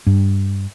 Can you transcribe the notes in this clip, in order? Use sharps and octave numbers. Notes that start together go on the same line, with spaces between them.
G2